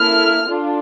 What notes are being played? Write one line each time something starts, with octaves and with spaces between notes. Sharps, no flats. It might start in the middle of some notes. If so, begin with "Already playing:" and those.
Already playing: A#3 E4 A4 F6
D4 F4 A4